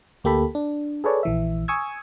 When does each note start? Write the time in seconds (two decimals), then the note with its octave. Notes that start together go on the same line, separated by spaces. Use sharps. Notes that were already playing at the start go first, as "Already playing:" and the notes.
0.24 D2 A#3 G4 A4 B5
0.55 D4
1.04 G#4 A4 B4 C#5 D5
1.23 A#1 E3 E5
1.68 G#5 C#6 D#6 E6 G#6